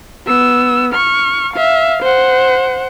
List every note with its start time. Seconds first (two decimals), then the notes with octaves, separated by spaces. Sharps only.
0.26 B3 E6
0.93 C#6 F6
1.53 E5 F5
2.02 C5 F#5